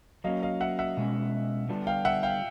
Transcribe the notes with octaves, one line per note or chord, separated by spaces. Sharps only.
F#3 A#3 C#4 D#5 F5
D#5 F5
E5 F#5
E5 F#5
B2 G#3 C#4
D3 G3 B3 D4 F4
F5 G5
E5 F#5
F5 G5